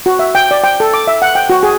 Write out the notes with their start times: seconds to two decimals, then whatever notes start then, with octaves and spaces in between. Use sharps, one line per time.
0.06 F#4
0.19 E5
0.35 G5
0.51 D5
0.64 G5
0.80 A4
0.94 D6
1.08 E5
1.22 F#5
1.35 G5
1.50 F#4
1.63 G#4